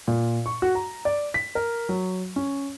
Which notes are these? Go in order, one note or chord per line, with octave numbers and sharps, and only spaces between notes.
A#2
C#6
F#4
A#5
D5
B6
A#4
F#3
C#4